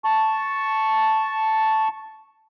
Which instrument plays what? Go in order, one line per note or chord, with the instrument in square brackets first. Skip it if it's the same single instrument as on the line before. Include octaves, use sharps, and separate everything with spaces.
[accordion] A5 C#6